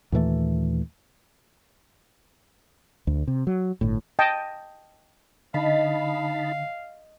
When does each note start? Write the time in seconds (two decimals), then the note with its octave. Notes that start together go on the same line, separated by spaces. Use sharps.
0.12 D#2 A#2 E3 A3
3.07 D2
3.28 C3
3.47 F#3
3.81 G1 A2
4.19 D#5 G5 A5
5.54 D3 D#4 D#5 F5 A5 B5